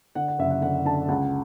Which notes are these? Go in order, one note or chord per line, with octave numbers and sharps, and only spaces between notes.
D3 F#5
F#5
F#1 E5
F#5
D3 F#5
D3 A5
C#2 F#5